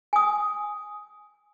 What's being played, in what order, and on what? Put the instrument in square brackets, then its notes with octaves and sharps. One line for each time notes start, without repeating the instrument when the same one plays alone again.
[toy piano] G#5 D#6